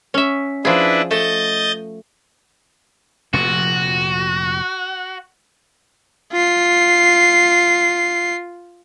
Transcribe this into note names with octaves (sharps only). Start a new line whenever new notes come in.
C#4 E5
F3 D4 E4 G#4 B4
A3 D#5 G6 A6
F1 F2 A#2 F#4
F4 C7